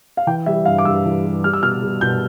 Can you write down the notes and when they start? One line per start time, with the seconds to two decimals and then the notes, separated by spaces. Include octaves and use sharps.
0.17 F5
0.27 E3 G5
0.46 G3 E5
0.65 G2 F5
0.78 D6
0.85 G2 E6
1.05 E3
1.24 G3
1.44 G3 F6
1.53 E6
1.62 B2 F6
1.82 G3
2.01 B2 G6